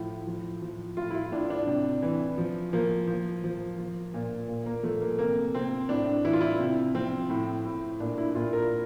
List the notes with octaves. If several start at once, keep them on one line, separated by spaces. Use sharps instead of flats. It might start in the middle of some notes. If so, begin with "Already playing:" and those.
Already playing: A2 F3
F3
F3
A2 F4
E4
F4
A2 D4
D4
C3
E3
F3
F3 A#3
F3
F3
F3
A#2
A#2
A#3
F3 A3
A#3
C3 A#3
C3 C4
A2 D4
E3 E4
F4
E4
C3
F3 C4
A2
A2
A#2 D4
E4
A#2 F4
A#4